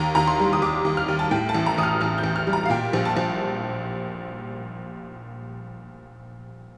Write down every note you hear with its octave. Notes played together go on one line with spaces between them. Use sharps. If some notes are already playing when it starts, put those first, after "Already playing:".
Already playing: D#2 A#5
D#2 A#5
C6
G3
D#6
D#2 D6
D#2
F6
D#2
A5
A2 G5
A5
A1
A#5
A1 D#6
F6
A1 F6
G6
A1
F6
G3
A#5
F5
A#2 G5
A#1
A5
A#1